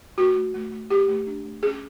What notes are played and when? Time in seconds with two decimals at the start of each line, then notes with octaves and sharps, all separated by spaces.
0.18 A3 F#4
0.36 A3
0.55 A3
0.72 A3
0.90 A3 G4
1.08 A3
1.27 D4
1.44 A3
1.62 C#4 G#4